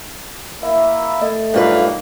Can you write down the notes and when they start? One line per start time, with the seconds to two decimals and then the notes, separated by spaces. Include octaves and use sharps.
0.63 A#3 E4 E5
1.22 A3 D#5
1.54 G2 D#3 F#3 A#3 F4 A#4 B4